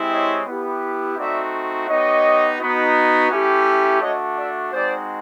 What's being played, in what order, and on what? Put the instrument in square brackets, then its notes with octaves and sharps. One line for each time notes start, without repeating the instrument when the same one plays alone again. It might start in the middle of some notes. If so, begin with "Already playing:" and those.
Already playing: [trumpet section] G#3 C4 E4 G4
C#5 D#5
B3 E4 G4
A3 C4 D#4 F#4 D5 E5
B3 D#4 G4 C#5 D#5
B3 D#4 F#4
A3 C#4 E4 G4
A3 D4 F#4 C#5 D#5
D5 E5
G#3 C4 D#4 F#4 C5 D5